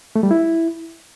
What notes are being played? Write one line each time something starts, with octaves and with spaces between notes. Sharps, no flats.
A3
G3
E4